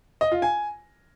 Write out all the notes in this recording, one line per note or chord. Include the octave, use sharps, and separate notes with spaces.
D#5
F4
G#5